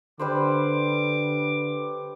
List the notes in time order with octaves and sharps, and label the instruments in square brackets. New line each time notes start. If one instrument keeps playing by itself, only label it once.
[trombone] D3 [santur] G3 B4 C5 [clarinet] D6